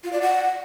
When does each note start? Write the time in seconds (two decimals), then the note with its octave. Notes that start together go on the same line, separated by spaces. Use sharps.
0.04 F4
0.13 D5
0.22 F#5